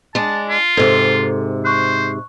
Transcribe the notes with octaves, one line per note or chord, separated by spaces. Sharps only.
G#3 D4 A5
F4
G#2 C3 A4
C5 C#6 F#6